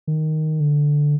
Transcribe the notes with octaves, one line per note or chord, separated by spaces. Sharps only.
D#3
D3